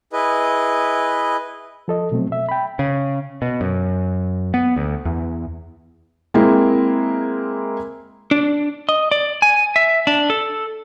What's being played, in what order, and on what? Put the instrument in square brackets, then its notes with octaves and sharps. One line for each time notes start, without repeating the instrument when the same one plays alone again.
[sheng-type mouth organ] E4 G#4 B4 D#5
[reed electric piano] F3 A4 D#5
B2 F#3 A3 C4
E5
G5 B5
[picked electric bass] C#3
B2
F#2
B3
D2
E2
[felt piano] G#3 A#3 C4 E4 A#4
[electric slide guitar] D4
D#5
D5
G#5
E5
D4
A4